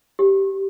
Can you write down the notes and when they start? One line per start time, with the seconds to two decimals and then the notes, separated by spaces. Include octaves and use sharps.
0.19 G4